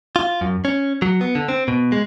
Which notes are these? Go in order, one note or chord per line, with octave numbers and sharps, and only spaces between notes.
F4
F#2
C#4
F#3
B3
D3
C4
B2
G#3